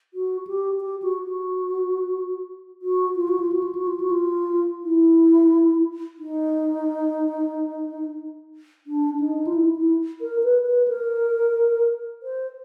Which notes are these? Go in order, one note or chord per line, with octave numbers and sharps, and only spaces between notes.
F#4
G4
G4
F#4
F#4
F#4
F4
F#4
F4
F#4
F4
F#4
F4
F#4
F4
E4
D#4
D4
D#4
F4
E4
E4
A#4
B4
B4
A#4
C5